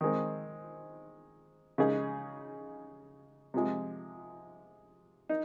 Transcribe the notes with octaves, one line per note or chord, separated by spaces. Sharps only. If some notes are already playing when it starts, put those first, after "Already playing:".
D#3 G#3 C4
C#3 G#3 D#4 G#4
C3 F3 G#3
D#4